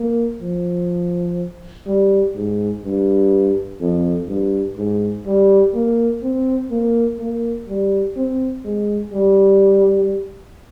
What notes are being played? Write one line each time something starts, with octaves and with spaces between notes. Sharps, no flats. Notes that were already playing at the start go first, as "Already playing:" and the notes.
Already playing: A#3
F3
G3
G#2
G2
F2
G2
G#2
G3
A#3
C4
A#3
A#3
G3
C4
G#3
G3